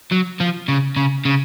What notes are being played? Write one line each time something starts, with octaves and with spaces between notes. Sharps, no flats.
F#3
F3
C#3
C#3
C#3